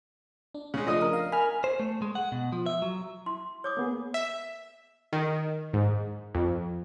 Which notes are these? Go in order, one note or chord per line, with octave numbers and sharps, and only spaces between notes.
D4
C#3 G#3
F3 A3 D4 D#5 D#6
A#4
F5
G#5 B5 F6
C5
A3
G#3
F#5
B2
F3
E5
F#3
E4 C6
C#5 D6 D#6
A#3 B3 G#4
E5
D#3
G#2
F2